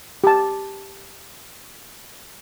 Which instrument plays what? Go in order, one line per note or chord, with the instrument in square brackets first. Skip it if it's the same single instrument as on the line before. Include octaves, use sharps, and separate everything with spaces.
[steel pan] G4 A5